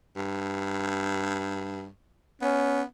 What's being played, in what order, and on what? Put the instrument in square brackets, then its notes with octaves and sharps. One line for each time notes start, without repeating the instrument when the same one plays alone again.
[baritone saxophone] G2
[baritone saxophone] B3 [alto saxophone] C#4